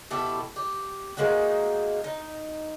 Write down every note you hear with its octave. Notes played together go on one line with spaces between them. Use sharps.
B2 E4 G4 A4
G4
G#3 A#3 D#4 F#4
D#4